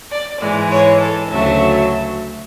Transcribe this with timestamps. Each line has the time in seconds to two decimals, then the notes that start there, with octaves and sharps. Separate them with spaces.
0.11 D5
0.41 G#2 E3 G#3
0.71 C#5
1.01 A4
1.30 D2 C#3 F#3 A3 E5